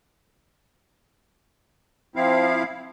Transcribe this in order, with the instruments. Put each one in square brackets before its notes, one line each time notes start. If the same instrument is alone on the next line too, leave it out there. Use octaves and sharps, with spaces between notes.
[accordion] F3 C4 E4 F5